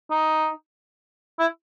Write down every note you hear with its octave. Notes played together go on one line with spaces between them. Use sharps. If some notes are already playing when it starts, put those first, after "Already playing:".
D#4
E4